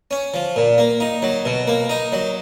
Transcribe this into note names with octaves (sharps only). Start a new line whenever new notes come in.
C#4
F3
A#2
A#3
D#4
F#3
B2
A#3
D#4
F#3